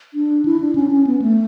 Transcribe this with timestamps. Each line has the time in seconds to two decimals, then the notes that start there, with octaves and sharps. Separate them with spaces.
0.14 D4
0.45 E4
0.60 D4
0.75 C#4
0.91 C#4
1.07 B3
1.22 A3